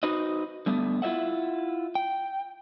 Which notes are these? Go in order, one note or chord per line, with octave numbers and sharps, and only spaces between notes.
D#4 F#4 B4 C5 D#5
D3 G3 A3 B3
E4 F4 C#5 D5 E5 F#5
G5